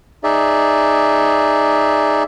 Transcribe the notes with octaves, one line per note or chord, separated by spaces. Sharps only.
D#4 G#4 D5 E5